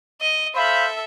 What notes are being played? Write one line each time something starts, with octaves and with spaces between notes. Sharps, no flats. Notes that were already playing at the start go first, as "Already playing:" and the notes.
D#5
A4 C5 E5 F5 B5